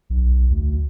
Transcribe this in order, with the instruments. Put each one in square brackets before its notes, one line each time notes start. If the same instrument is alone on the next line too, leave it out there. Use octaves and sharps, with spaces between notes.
[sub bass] B1
D2